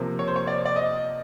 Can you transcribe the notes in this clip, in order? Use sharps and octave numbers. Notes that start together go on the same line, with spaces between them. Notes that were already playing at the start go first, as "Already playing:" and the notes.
Already playing: C3 F3 A#3
C#5
C5
C#5
D5
D5
D#5